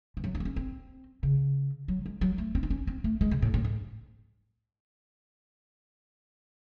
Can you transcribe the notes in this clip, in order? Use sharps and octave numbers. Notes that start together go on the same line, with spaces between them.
E3
F#3
E4
C4
C#4
C4
C#3
F#3
G#3
F#3
A3
C4
D#4
C#4
C4
A3
G#3
C3
A2
A2
G#2